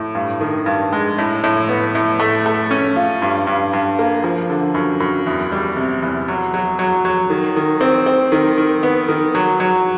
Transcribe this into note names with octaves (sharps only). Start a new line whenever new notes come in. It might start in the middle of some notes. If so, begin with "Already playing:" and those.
Already playing: A2
G2
D#3
G2
G#3
A2
A2
B3
A2
A3
A3
C#4
F4
G2
G2
G2
A#3
F3
D3
F#2
F#2
E2
G3
C3
E2
F#3
F#3
F#3
F#3
D#3
D#3
C4
C4
D#3
D#3
B3
D#3
F#3
F#3